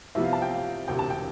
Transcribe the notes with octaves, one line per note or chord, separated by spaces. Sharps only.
C2 C3 F3 B3 E5
F5
A5
G5
F5
E1 D2 C3 G5
A5
G5